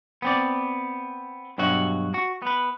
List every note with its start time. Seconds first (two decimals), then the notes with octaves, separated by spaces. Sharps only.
0.22 B3 C4 D5
1.58 G2 B2 F#3 F#4
2.14 F#4
2.42 B3 B4